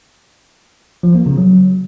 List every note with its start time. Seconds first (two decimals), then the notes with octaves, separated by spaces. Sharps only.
1.03 F3
1.15 A#3
1.26 C#3
1.38 F#3